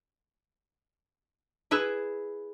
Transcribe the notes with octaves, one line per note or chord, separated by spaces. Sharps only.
E4 G#4 B4 E5